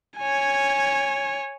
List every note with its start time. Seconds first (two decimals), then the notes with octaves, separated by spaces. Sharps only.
0.19 C#5 G#5